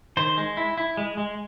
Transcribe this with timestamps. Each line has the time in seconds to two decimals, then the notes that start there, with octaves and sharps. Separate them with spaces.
0.17 D#3 C5
0.37 G#3
0.57 E4
0.78 E4
0.97 G#3
1.17 G#3